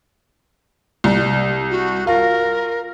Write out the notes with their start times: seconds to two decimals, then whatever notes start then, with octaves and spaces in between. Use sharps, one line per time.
1.04 C2
1.70 F#4
2.07 F4 A#4